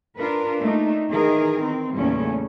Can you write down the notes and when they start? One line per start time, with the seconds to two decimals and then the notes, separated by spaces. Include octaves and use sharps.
0.19 D4 F4 A#4 B4
0.61 A3 A#3 D4 D#4
1.10 D#3 E3 G#4 A#4
1.63 C4
1.94 E2 A#2 C#3 G3 A3 C#4